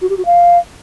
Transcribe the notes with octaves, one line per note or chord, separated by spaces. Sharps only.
F#4
G4
F#4
F5